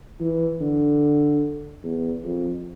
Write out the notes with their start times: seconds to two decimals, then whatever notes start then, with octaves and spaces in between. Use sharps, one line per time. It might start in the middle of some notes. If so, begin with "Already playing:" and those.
0.20 E3
0.61 D3
1.83 E2
2.24 F2